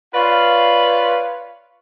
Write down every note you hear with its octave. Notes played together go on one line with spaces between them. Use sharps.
F4 B4 C#5 D5 F5